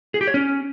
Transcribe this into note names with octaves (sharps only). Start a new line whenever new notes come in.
G#4
G4
C#5
C#4